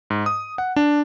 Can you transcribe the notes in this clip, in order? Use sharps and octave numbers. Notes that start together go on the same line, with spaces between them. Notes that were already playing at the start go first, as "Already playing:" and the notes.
G#2
D#6
F#5
D4